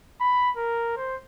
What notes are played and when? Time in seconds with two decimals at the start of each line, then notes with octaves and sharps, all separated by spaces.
0.21 B5
0.57 A#4
0.97 C5